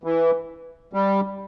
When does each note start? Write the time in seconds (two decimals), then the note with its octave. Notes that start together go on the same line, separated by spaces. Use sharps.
0.04 E3
0.93 G3